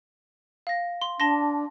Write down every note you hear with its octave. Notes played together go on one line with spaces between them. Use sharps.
F5 A#6
C6
D4 A5 C6 A#6